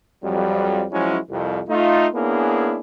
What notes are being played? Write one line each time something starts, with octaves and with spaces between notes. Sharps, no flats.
F2 F#3 G3
F3 F#3 G#3 C#4 E4
C2 F2
A3 D#4 F4
A#3 B3 C#4 D4 E4 G#4